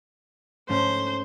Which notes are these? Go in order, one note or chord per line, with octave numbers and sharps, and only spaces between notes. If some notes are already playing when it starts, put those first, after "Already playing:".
G#2 A3 C#4 C5